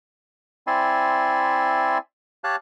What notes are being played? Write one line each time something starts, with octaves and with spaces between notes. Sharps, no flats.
C4 E4 D5 E5 G#5 C6
G4 C#5 F5 A5 F#6